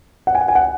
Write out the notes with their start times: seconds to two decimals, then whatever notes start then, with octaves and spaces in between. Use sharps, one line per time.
0.27 F#5
0.35 G#5
0.41 F#5
0.48 G#5
0.55 F#5